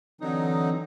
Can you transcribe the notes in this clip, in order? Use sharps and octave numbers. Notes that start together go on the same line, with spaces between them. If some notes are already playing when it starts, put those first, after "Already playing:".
D3 E3 F#3 C4 D#4 D#6